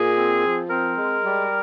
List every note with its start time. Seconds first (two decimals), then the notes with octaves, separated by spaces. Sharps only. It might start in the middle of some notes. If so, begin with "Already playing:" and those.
Already playing: A#2 G#4
0.17 C4
0.44 F3
0.70 C4 A#4
0.97 G#3
1.23 G3